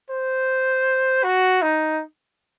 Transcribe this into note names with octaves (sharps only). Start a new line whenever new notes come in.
C5
F#4
D#4